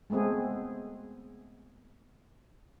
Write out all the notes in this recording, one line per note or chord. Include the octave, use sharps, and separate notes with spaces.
G#3 A3 B3 C4 G#4